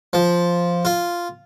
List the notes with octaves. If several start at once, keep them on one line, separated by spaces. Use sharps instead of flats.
F3
F4